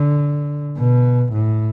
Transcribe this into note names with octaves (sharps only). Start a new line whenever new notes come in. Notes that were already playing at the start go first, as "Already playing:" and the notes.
Already playing: D3
B2
A2